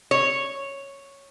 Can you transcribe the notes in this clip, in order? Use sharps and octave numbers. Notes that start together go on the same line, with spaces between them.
C#5